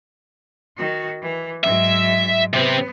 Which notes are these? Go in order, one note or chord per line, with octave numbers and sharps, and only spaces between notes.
D#3 F#4
E3
G#2 F#3 E5
C3 B3 C4